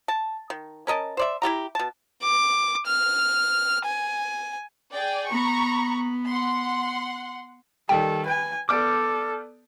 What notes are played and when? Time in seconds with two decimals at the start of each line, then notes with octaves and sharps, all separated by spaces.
0.08 A5
0.50 D#3
0.87 C#4 A#4 D#5 A5
1.17 C5 D5 E5
1.42 E4 F4 G4 A#5
1.75 B2 A5
2.22 D6
2.86 F6
3.85 G#5
4.94 G#4 D5 G5
5.30 B3 A#5 B5 C#6
6.27 F#5 C6
7.89 D#3 G3 A4 G5
8.25 B4 G#5
8.69 B3 A4 D5 D6 F6 G6 D7